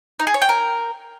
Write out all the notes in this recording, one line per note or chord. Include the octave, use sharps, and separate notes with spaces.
D#4
G#4
C#5
G5
A#4